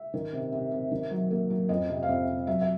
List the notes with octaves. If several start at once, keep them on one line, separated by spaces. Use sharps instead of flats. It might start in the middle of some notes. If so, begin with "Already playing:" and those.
Already playing: E5
D#3
C3
C3
C3
D#3
F#3
A#3
F#3
F2 D#5
C3
F5
F2 E5
C3
F#3 E5
E5